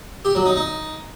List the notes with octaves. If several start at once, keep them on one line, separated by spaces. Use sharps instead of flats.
G4
F#3
D#4
D#4